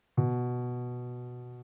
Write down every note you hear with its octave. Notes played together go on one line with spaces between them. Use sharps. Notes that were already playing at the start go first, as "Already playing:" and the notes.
B2